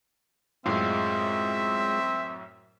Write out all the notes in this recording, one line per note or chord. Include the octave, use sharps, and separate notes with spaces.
F#2 A2 G#3 C4 F4 E5